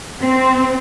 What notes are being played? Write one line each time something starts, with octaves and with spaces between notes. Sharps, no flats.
C4